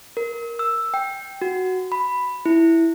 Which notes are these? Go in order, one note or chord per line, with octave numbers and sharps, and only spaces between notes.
A#4
E6
G5
F#4
B5
E4